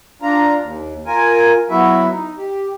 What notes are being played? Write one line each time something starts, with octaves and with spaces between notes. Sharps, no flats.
D4 F4 A#5
D#2
F4 A#4 G#5
F#3 B3 E4 F#4 E5
D#4
G4